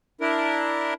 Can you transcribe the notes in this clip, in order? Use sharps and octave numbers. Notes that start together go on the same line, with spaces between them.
D4 E4 A#4